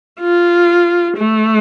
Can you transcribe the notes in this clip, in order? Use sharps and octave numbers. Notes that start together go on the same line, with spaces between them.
F4
A3